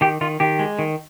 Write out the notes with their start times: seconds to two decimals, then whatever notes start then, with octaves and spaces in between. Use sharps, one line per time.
0.01 D#3 G4
0.21 D#3 F4
0.40 D#3 G4
0.59 G#3
0.79 D#3